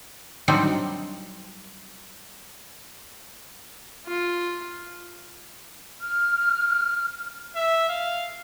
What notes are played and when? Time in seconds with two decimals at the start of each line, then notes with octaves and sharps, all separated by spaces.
0.48 F#3 G3 C4 D4 D#4 F#4
4.06 F4
6.02 F6
7.56 E5
7.89 F5